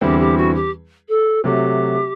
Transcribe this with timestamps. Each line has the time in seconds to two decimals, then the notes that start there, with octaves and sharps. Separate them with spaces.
0.01 E2 D3 G3 C4 E4 G4
0.19 G4
0.37 F#4
0.54 G4
1.08 A4
1.44 C3 F#3 A3 G4